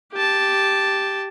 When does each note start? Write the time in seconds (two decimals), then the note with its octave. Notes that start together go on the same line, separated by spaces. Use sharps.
0.13 G4 A5